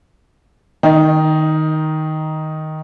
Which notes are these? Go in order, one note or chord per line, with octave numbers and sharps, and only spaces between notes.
D#3 D#4